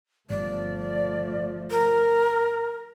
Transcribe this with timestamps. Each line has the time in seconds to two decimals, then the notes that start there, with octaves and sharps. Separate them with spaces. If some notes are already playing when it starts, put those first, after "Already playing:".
0.30 G1 F3 A3 D5
1.70 A#4